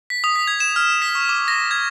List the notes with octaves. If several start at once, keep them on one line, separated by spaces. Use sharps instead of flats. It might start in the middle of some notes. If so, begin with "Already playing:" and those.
B6
D#6
B6
G#6
E7
F6
B6
C#6
D6
A#6
G#6